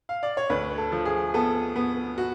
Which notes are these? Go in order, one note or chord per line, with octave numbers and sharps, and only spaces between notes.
F5
D5
C#5
D2 B4
A4
F3
G#4
B3 A4
B3
F#4